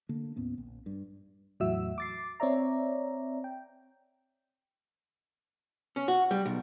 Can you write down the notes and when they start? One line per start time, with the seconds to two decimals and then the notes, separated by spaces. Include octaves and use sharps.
0.09 D3 A#3
0.36 D#2 A2 B3 C#4
0.58 A#1
0.86 G2
1.60 E2 A2 F#3 F#4 E5 E6
1.98 D6 A6 C7
2.40 C4 C#5 D5 E5 A#5
3.44 G5
5.96 C#4
6.08 F#4
6.31 G3
6.45 B1